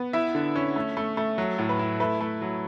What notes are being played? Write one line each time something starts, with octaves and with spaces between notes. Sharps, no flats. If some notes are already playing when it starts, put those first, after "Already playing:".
Already playing: B3
E4 E5
D3
C#4
A3
A3
A3
F#3
A2
B4
E4
A3 B4
A3
F#3